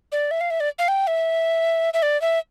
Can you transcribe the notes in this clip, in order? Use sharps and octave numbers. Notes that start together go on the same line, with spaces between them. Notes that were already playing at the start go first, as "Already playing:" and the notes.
D5
E5
F5
E5
D5
F5
G5
E5
E5
D5
E5